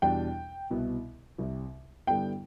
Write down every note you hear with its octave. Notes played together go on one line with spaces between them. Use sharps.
E2 B2 G3 D4 G5
C2 B2 B3 E4
C2 C3 G3
G2 D3 G3 B3 E4 G5